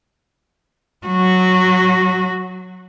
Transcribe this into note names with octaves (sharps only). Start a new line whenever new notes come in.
F#3 F#4